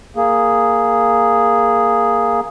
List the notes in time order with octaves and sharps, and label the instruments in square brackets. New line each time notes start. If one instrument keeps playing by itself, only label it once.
[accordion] A#3 G#4